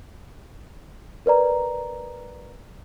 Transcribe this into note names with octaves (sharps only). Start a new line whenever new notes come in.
A#4 B4 D5 A#5